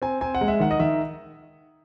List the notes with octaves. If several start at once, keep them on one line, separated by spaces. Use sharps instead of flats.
C4 G#5
C4 G#5
F#5
G#3
E5
D#3 F#5
D#5
D#3 E5